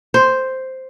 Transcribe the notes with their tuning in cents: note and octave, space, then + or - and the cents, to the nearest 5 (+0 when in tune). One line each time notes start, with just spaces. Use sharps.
C5 +0